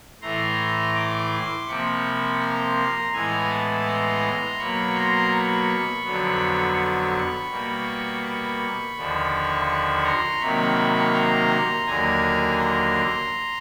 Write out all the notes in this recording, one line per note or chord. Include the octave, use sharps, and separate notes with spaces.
A2 E3 A3 A#5 C6
C6 D6
C3 F3 A#3 B5 C#6
A#5 C6
A2 E3 G#3 B3 G#5 A#5
A5 B5
A#5 C6
B2 F#3 A#3 B5 C#6
A#5 C6
B5 C#6
F2 D3 F#3 B3
B5 C#6
B2 G3 A#3
B5 C#6
D#2 D3 F3
B5 C#6
A#5 C6
C3 D#3 F#3 A#3 B5 C#6
A#5 C6
D#2 D3 F#3 A#3 G#5 A#5
A#5 C6